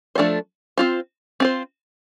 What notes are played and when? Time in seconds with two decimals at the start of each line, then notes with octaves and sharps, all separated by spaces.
0.15 F3 A3 D4 A4 C5
0.78 C4 F4 C5
1.40 C4 F4 C5